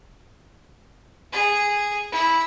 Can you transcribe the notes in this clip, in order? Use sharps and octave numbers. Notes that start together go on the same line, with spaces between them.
G#4
E4